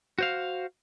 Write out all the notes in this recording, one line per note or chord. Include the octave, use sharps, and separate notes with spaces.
F#4 C5 F5